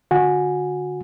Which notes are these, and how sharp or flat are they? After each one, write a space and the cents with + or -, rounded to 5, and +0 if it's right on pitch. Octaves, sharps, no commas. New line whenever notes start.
D3 +0 F#4 -25 G#5 +0